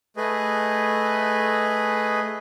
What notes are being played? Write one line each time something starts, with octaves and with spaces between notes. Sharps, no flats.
A3 G#4 B4 D#5